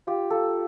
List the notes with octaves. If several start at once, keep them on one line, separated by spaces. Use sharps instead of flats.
F4 G4
A#3 A4